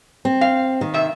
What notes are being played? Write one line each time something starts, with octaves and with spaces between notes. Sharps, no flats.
C4
F5
D#3
C3 E5